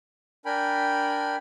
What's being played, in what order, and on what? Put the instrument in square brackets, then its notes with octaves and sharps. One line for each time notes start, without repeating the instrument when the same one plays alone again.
[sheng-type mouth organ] D4 A#4 G5 G#5 B5